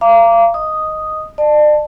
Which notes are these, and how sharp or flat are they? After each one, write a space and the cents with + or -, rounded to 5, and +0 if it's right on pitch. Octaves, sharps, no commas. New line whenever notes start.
F5 -35 A#5 +0 D6 -15
D#5 +0 D#6 +0
D5 +40 A5 +0